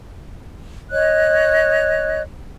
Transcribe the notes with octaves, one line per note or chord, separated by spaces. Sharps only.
C#5 D#5 F#6